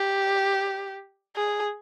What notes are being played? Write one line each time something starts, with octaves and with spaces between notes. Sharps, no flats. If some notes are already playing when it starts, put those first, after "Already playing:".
Already playing: G4
G#4